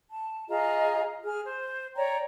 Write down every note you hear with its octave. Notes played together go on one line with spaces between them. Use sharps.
A5
F4 G#4 D#5 A#5
G#4 F6
C5
C#5 D5 G5 A#5